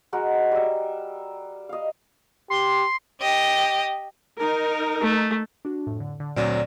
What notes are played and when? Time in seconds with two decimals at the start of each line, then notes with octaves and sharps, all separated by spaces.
0.13 G#3 F#4 A#4
0.52 G3 E5
1.69 D#5 F5
2.50 G4 C6
3.21 G4 D#5
4.39 D#4 A#4
5.01 A3
5.65 D4 F#4
5.87 F2 A2
6.00 D3
6.20 D3
6.36 D2 A#2 F#3 C4 D5 F6